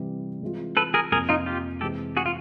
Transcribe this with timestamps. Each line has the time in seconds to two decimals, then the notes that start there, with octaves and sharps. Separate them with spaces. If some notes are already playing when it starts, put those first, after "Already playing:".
Already playing: C3 E3 G3
0.42 E3 G#3 C4 F4
0.77 A4 B4
0.94 G#4 A#4
1.11 F2 C3 F3 A#3 G#4 A#4
1.29 D#4 F4
1.46 F4 G4
1.81 C3 E3 G#3 C4 G4 A4
2.17 F#4 G#4
2.26 F4